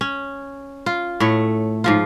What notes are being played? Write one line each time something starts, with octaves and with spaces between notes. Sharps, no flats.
C#4
F4
A2 A3 C#5
G#2 F3 F4